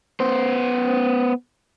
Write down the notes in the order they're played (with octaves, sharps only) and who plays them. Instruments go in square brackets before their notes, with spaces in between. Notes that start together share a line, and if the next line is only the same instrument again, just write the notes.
[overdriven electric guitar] B3 C5